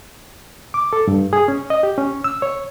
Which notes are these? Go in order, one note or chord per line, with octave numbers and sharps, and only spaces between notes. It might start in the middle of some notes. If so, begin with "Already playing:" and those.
D6
A4
G2
G#4
C#4
D#5
G4
C#4
E6
C#5